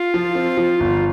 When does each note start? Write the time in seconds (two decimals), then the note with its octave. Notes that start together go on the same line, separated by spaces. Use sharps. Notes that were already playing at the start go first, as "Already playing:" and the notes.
Already playing: F4
0.14 F3
0.35 C4
0.57 F3
0.80 G1